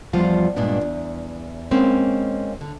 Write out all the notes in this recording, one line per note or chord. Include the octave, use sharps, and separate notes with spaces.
E2 F3 G3 F4 F5 F#5
G2 A#2 G#3 B3 D4
E2
G#3 A#3 C4 C#4 D#4
D3